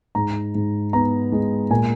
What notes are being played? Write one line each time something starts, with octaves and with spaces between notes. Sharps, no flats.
G#2 A#5
G#2
B3 A#5
G#3
A#2 G#5